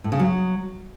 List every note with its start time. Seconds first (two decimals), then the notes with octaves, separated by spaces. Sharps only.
0.04 A2
0.12 C#3
0.19 F#3